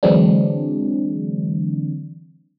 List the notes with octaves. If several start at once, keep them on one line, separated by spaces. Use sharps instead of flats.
D3 E3 F#3 G#3 C4 D4